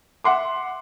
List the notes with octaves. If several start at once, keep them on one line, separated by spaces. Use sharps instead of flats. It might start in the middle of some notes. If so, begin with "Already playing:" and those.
E5 F#5 C6 D6